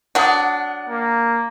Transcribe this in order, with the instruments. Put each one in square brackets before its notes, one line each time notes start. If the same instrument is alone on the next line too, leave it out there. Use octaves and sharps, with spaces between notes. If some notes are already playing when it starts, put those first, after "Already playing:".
[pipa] F#3 D4 [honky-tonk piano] F#5 D#6
[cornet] A#3